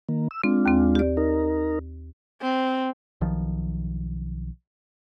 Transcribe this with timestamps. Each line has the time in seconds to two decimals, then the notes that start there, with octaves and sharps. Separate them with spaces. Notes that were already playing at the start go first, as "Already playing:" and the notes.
0.09 D#3 A#3
0.31 E6
0.44 G#3 C4 D4 F4
0.66 D#2 C4
0.95 G4 D5
1.17 D#4 A#4
2.42 C4
3.21 B1 D#3 F3